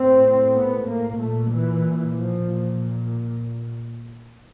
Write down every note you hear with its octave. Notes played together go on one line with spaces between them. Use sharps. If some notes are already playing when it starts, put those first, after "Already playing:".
Already playing: A2 C4
B3
A#3
A#2 A3
E3
F3
A#2